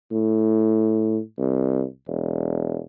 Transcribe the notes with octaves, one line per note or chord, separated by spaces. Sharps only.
A2
C2
E1